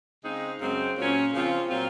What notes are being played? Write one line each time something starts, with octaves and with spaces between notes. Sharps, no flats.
C#3 G#3 C4 D#4
F#2 C#3 G#3 C4
A#2 F#3 C#4
C#3 F3 C4 F4
A#2 F#3 C4 F4